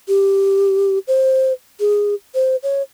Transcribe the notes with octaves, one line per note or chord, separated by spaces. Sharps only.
G4
C5
G#4
C5
C#5